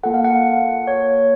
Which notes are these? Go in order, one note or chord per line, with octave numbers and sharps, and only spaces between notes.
A#3 F4 A4 F#5
F5
F#5
C#5